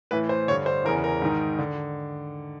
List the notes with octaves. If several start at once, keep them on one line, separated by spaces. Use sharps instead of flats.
A2 E3 B4
C5
G2 D3 C#5
C5
E2 C#3 E3 A#4
A#4
G#2 D#3
D3